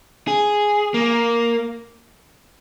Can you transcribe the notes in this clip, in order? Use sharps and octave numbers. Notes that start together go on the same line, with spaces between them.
G#4
A#3